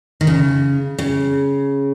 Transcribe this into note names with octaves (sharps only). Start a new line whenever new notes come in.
D#3
C#3
C#3